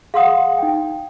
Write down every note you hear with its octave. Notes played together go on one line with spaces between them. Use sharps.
G#4 F5 F#5 C6 D#6
D#4 G5